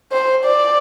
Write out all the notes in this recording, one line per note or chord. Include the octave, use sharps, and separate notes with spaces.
C5
D5